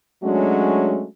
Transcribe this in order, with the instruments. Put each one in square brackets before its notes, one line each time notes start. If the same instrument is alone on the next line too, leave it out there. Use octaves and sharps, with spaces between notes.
[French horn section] F#3 G#3 A3 C#4 D4 F#4